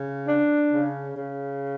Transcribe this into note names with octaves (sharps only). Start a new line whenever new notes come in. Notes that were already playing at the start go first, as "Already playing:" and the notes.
Already playing: C#3
D4
C#3
C#3